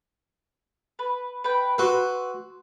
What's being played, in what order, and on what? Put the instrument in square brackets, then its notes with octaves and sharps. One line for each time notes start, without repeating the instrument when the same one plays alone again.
[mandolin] B4
B4 G5
[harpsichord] F#4 B4 [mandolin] C6 E6